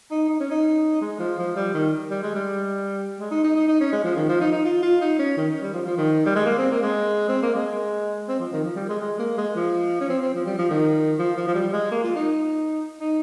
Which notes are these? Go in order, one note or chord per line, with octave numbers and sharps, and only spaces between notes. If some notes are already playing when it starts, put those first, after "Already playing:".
D#4
D#4
C#4
D#4
G#3
F3
F3
G3
D#3
G3
G#3
G3
G#3
D#4
D#4
D#4
D#4
C#4
G#3
F3
D#3
F3
D#4
D#4
F4
F4
D#4
C#4
D#3
G3
F3
F3
D#3
G3
G#3
A#3
C4
A#3
G#3
C4
A#3
G#3
C4
F3
D#3
F3
G3
G#3
G#3
A#3
G#3
F3
C#4
C4
C4
F3
G3
F3
D#3
F3
F3
F3
G3
G#3
A#3
F4
D#4
D#4